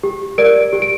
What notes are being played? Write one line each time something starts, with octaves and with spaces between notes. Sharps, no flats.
G4
A#4 D5 D7
G4
D7